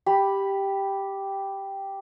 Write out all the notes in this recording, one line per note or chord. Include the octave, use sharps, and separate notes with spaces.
G4 B5